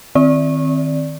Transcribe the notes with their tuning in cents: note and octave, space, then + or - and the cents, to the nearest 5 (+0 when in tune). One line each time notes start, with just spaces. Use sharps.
D#3 +0 C4 +0 D5 -10